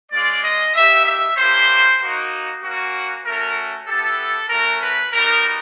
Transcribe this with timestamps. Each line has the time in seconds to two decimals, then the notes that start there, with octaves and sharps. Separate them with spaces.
0.12 G#3 C#4 F4 D5
0.43 D#5
0.74 A#3 D#4 G4 E5
1.06 E5
1.36 A#3 C#4 E4 G4 C5
2.00 A#3 D#4 F#4
2.62 A#3 C#4 F#4
3.25 A3 C#4 F#4 A#4
3.87 B3 E4 G4 A4
4.49 A3 C#4 F#4 A#4
4.81 B4
5.11 G3 B3 D#4 F#4 A#4